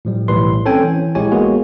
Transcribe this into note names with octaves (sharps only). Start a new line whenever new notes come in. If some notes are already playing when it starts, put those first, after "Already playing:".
A2 F3 G3
B1 A2 E3 G3 B4 C6
C4 C#4 A4 C#5 G5 G#5
E3
A#1 G#3 E4 G4 C#5 G#5
G#3 A#3 B3 F#4 G#4